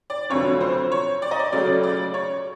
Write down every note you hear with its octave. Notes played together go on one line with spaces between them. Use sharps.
D5
F1 F2 D3 F#3 C#5
C5
C#5
D5
D#5
D5
C#2 C#3 F#3 A3 D5
D5
C#5